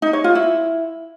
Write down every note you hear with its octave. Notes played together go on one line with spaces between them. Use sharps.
D#4
C#5
F4
E4